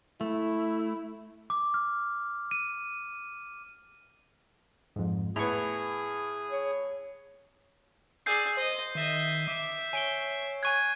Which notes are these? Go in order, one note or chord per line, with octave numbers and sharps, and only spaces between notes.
A3 E4
D6
F6
D#7
F2 G#2
A2 B3 G#4 C#6 F6
C#5
G#4 D5 E6 G6 C7
C5 D#5
D#3 D#5 E5
E5 D6
C#5 G#5 D7 G7
G#5 C#6 F#6 G#6 D#7